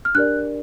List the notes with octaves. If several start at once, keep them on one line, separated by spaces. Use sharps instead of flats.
F6
D4 G4 A#4 D5 F#6